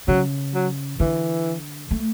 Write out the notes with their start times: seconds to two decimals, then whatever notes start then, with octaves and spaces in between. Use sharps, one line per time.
0.08 C#3 F#3
0.54 F#3
1.00 D3 E3
1.91 A3